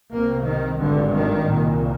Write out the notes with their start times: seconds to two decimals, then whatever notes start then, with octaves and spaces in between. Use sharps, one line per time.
0.12 C2 C3 A#3
0.46 D#3
0.80 G#1 G2 D3
1.13 D#3
1.47 C2 A#2